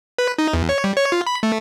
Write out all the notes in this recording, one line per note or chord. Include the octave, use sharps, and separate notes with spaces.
B4
D#4
E2
C#5
G3
C#5
F4
B5
A3